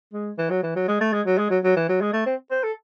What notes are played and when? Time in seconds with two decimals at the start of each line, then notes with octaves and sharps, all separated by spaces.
0.13 G#3
0.38 E3
0.50 F#3
0.63 E3
0.76 F#3
0.88 G#3
1.01 A3
1.13 G#3
1.26 F#3
1.38 G#3
1.50 F#3
1.64 F#3
1.76 E3
1.89 F#3
2.01 G#3
2.13 A3
2.26 C4
2.51 C5
2.63 A4